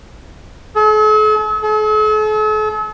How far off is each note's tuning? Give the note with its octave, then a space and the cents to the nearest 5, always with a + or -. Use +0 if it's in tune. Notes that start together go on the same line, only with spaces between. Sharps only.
A4 -45
A4 -45